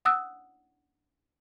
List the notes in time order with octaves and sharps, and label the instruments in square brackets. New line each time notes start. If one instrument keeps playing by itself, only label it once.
[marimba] F#5 D#6 E6 F#6